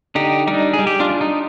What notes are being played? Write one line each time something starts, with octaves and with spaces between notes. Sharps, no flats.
D3 D#4 G4
G3 D4 D#4
G#4
G3
G4
D4 F4
D4
D#4